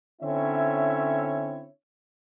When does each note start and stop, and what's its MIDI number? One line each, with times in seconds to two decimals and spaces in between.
0.22 1.66 50
0.22 1.66 60
0.22 1.66 61
0.22 1.66 64
0.22 1.66 73
0.22 1.66 76